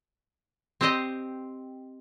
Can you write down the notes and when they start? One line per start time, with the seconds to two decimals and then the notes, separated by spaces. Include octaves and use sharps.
0.81 C4 G4 C5 D#5